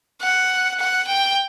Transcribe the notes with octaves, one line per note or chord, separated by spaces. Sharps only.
F#5
F#5
G5